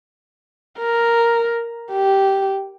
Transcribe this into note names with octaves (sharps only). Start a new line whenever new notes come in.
A#4
G4